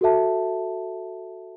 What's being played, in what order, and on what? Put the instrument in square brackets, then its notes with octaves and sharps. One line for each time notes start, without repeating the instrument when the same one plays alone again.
[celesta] F#4 A4 E5 A5